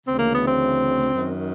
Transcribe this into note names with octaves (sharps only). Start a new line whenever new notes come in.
D2 C#3 E3 C4
A#3
B3
C4
F#2 D#3